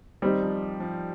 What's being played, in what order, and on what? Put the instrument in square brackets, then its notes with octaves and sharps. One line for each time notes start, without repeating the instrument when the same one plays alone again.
[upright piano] D#3 [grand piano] G3 C4 D#4
[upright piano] F3
F3